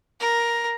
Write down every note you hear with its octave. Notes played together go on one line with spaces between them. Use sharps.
A#4